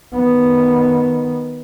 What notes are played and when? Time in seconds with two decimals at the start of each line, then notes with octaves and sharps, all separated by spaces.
0.14 D#3 B3